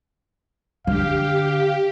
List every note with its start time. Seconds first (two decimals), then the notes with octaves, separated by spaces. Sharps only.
0.87 D3 G4 F5